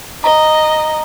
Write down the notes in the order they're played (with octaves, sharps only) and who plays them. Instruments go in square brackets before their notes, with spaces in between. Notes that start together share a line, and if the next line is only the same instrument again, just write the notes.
[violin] D#5 [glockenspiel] A#5